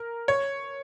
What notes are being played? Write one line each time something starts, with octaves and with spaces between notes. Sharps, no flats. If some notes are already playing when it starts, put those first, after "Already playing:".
Already playing: A#4
C#5